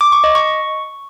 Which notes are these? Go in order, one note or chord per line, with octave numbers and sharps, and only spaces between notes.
D6
C#6
D#5
C#6